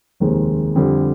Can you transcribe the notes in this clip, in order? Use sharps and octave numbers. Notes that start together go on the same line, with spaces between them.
F1 D#2 D#3 G#3 C4
F2 D3 G3